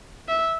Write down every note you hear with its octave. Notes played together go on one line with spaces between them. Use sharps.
E5